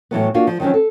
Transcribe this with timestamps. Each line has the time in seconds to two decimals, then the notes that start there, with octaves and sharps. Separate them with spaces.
0.11 A2 E3 F#3 B3
0.34 A#3 D4 F4 F#4
0.47 F3
0.60 D#3 F3 F#3 C4 C#4
0.74 A4